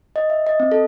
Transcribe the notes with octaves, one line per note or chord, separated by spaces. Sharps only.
D#5
E5
D#5
C4
A4